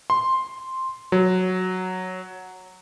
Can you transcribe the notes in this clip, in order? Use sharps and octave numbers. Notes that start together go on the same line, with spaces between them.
C6
F#3